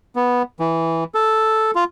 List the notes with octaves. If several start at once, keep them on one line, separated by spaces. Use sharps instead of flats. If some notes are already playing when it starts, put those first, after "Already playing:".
B3
E3
A4
F4